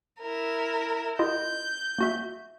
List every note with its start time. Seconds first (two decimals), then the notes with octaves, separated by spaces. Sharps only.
0.19 E4 A#4
1.19 E4 F4 D#5 G6
1.99 A#3 F#4 E5